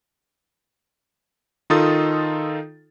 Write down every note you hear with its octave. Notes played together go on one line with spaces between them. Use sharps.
D#3 D#4 F4 A4 D#6 A6